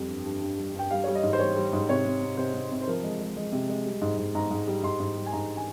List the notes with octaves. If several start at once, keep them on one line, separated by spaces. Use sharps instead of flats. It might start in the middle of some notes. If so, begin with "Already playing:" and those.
Already playing: F2 G3
G2
G2
G2
G3
G2 G5
G3 F5
G3 C#5
D#5
G#2
C5
G3 C#5
G3
G#2
C3 C#5
C3
C3
C3 C5
C3
C3
C5
F3 A#4
G#3
G#3
G#3
C3
G#3
G3
G#2
G#2
G#2 A#5
G#2
G3
G#2 C6
G#2
G3
G#5
G#2 A#5
G#5